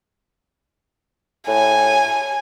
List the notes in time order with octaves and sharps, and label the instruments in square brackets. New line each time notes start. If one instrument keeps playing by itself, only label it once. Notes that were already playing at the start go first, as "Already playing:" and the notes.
[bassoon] A2 [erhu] G#5